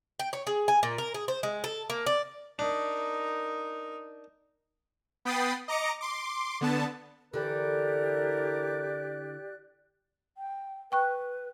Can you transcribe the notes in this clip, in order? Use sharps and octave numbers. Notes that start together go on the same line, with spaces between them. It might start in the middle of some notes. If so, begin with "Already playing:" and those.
G5
C#5
G#4
G#5
A#2
A#4
G#4
C5
G#3
A4
A#3
D5
D4 D#4 A#4
B3 G5 B5 D#6 A6 C7
D#5 A#5 D6 A#6 C#7
C6 D6
D3 B3 A5
D3 E3 E4 G4 A4 A#4 D5 F#6
G5
B4 G5 C#6 F#6